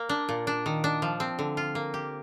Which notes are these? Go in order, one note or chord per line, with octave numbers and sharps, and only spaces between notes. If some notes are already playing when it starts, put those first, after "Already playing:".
Already playing: A#3
D4
A#2
D4
D#3
D4
F3
C4
D3
F4
A#3
G4